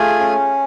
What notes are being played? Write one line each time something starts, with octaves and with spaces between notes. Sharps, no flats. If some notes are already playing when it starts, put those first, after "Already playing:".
Already playing: A3 F4 G#4 G#5
C#4